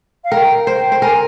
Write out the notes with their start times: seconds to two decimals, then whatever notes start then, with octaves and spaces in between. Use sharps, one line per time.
0.24 F5
0.31 A#4 G5
0.67 C5
0.78 G5
0.92 C5
1.02 A#4 G#5